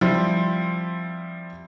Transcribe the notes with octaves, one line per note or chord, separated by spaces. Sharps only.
F3 G3 C4 E4